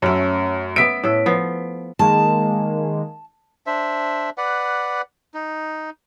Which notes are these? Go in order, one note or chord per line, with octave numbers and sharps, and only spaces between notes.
F#2 A3 C#4
B3 E5 B6 D7
A2 A4
F3 B3
D#3 G#3 A#3 A5
D4 C5 E5
B4 D5 F#5
D#4